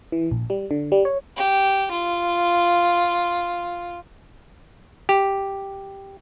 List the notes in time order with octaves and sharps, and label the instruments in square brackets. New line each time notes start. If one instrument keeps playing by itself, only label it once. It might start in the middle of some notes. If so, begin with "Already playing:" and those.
[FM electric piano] E3
A#1
G3
D3
G3
C#5
[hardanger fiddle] G4
F4
[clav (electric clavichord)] G4